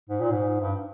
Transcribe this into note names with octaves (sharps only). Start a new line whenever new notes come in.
G#2
A#2
G#2
G2